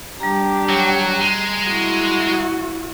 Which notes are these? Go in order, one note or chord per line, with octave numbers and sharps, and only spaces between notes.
G3 D4 G4 A#5
F#3
G#3
E4 F#4